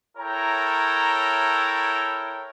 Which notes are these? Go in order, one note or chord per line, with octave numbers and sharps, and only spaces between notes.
E4 A4 A#4 C#5 G5 A#5